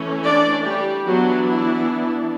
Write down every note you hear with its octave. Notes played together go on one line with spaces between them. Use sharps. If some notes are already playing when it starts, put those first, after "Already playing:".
Already playing: E3 A3 C#4
D4 D5
G3 G4
E3 F#3 B3 D4 F#4
E4